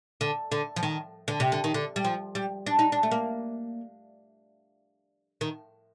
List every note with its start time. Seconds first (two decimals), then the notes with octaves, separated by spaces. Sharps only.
0.21 D3
0.52 D3
0.76 F3
0.83 D#3
1.28 D3
1.40 C3
1.52 D3
1.64 D#3
1.74 D3
1.96 G3
2.05 F3
2.35 G3
2.67 D4
2.79 D#4
2.92 D4
3.03 A3
3.11 A#3
5.41 D#3